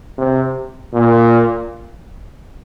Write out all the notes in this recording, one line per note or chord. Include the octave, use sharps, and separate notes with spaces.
C3
A#2